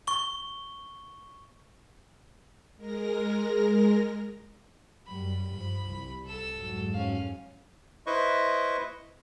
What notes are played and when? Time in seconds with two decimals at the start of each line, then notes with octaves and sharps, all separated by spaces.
0.07 C#6 G7
2.76 G#3 A#4 A#6
5.07 F#2 G3 B5
5.53 G2 F3
5.88 C2
6.25 A4 E6
6.54 F2 G#2 F#3
6.93 C#4 F5
8.06 E4 B4 C5 D#5 C#6